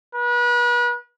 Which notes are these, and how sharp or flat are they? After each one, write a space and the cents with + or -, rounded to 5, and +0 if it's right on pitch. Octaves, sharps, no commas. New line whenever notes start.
B4 -35